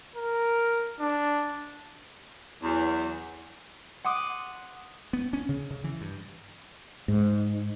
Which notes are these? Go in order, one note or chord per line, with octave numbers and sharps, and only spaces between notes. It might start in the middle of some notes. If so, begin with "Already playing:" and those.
A#4
D4
E2 F#3
F#5 C6 D6 D#6 D#7
B3
C#4
C#3
C#3
E3
G2
G#2